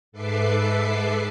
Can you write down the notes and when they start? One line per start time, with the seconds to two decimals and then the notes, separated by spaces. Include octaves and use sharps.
0.12 G#2 A4 B4 E5 D6 C7